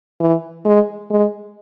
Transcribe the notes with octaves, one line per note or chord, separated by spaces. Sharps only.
E3
G#3
G#3